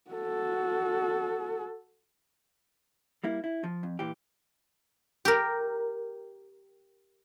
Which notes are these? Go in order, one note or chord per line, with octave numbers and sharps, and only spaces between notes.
F#4 A4
G3 A#3 E4
E4
F3
F2
A#2 E3 G4
G4 A#4